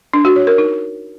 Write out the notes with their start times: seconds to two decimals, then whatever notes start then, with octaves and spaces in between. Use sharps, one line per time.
0.14 D4
0.25 F#4
0.36 C#5
0.47 A#4
0.58 D#4